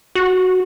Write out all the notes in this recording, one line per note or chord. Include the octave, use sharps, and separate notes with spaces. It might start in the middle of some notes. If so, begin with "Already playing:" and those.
F#4